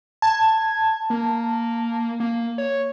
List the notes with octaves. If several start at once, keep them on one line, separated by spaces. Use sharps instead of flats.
A5 G#6
A#3
A#3
C#5